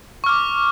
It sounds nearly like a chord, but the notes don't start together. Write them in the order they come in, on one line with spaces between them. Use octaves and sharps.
C#6 F6 D6